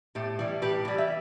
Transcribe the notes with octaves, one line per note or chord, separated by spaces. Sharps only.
A2 G4
E3 G3
A2 G4 B4
E3 G3
E5